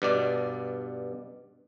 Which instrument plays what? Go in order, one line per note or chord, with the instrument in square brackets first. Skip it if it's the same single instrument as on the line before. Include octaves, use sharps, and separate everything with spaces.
[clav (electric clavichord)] G2 B2 D5